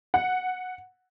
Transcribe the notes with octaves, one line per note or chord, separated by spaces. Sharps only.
F#5